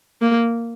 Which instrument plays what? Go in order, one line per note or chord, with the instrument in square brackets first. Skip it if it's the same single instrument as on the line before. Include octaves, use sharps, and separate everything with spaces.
[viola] A#3